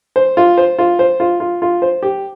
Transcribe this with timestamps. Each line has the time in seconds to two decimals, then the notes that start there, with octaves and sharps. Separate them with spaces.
0.16 C5
0.37 F4
0.57 C5
0.79 F4
0.99 C5
1.20 F4
1.40 F4
1.62 F4
1.82 C5
2.03 G4